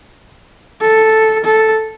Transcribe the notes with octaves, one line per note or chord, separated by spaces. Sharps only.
A4
A4